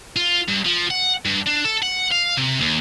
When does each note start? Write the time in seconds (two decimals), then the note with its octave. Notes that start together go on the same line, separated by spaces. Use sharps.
0.16 F4
0.48 G2
0.65 F3
0.90 F#5
1.25 G2
1.46 D4
1.64 A4
1.82 F#5
2.12 F5
2.37 C3
2.61 D#2